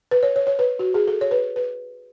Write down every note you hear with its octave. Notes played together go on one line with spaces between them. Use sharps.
B4
C#5
C#5
C#5
B4
F#4
G#4
A4
C#5
B4
B4